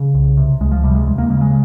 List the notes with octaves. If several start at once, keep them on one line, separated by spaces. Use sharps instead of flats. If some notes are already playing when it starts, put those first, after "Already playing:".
Already playing: C#3
C2
C3
C#2 G#3
F3
C3 G3
G#3
D#2
A#3
C#3 G#3
G#3